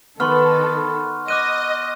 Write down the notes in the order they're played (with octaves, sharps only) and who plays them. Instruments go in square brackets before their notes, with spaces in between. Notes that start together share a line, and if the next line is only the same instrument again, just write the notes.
[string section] D#3 A4 [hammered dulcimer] B3 [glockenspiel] C6 C#6 F6
[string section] D#5 [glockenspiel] D6 F#6 D#7